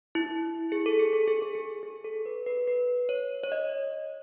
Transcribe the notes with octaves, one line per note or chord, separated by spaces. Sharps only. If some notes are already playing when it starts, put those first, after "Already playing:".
E4
G#4
A4
G#4
A4
G#4
A4
G#4
G#4
A4
B4
B4
B4
C#5
C#5
D#5